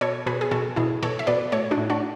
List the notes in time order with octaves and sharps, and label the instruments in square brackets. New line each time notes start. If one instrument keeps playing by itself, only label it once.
[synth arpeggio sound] B2 A4 C#5
B2 G#4 B4
G#4
B2 F#4 A4
B2 E4 G#4
B2 A4 C#5
E5
B2 B4 D5
A2 A4 C#5
D4 F#4
A2
D4 F#4